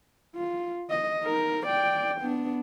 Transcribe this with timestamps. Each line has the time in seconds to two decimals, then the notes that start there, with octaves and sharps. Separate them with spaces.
0.36 F4
0.90 D#5
1.24 D#4 A#4
1.67 D5 G5
2.21 B3 D4